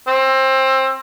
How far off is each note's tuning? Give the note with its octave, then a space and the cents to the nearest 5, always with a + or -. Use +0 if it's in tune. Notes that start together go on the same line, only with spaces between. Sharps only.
C4 +25